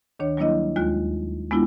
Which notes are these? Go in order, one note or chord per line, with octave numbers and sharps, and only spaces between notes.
D2 D#3 D4 C#5
F#3 G3 A#3 D4 E4 D#5
D#2 G#3 F4 F#6
G#3 B3 D4 E4 F4